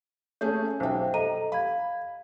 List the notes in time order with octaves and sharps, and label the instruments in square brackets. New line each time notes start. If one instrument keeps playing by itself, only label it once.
[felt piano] A3 C#4 G#4 [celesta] G6
[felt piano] B1 G5 [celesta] C5 E5
[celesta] A4 D#5 D#7 [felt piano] A#5
[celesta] F5 G#6 [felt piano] B5